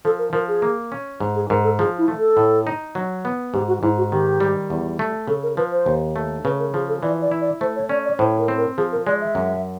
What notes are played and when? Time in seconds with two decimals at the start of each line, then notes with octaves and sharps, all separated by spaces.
0.05 F3 A4
0.19 A#4
0.33 F3 A#4
0.48 G#4
0.62 A#3
0.92 C#4
1.20 G#2
1.35 G#4
1.50 G#2 A#4
1.64 A4
1.79 F3 G#4
1.98 E4
2.08 A3
2.18 A4
2.37 A2
2.67 D#4
2.95 F#3
3.25 B3
3.54 G#2 G4
3.68 F#4
3.82 G#2 E4
3.98 F#4
4.12 D#3 G4
4.40 G3
4.70 E2
4.99 A3
5.28 C#3 A4
5.43 A#4
5.57 F3 B4
5.71 C5
5.86 D#2
6.16 A3
6.44 C#3 B4
6.59 A#4
6.74 F3 G#4
6.88 A4
7.02 E3 D5
7.22 D5
7.31 E4
7.41 D5
7.61 A3 C5
7.76 C#5
7.89 C#4 D5
8.05 D5
8.19 A2 C5
8.39 A#4
8.48 C4
8.58 A#4
8.78 F3 G#4
8.92 A#4
9.06 G#3 D5
9.21 E5
9.35 F#2